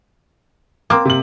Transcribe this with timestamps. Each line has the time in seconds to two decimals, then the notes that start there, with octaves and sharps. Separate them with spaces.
0.90 A#3 C4 D6
1.05 C3 F#7